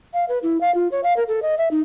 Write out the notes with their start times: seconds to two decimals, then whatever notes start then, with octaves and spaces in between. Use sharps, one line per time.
0.14 F5
0.29 B4
0.43 E4
0.61 F5
0.74 F4
0.91 C#5
1.03 F5
1.16 A#4
1.28 A4
1.42 D#5
1.58 E5
1.71 D#4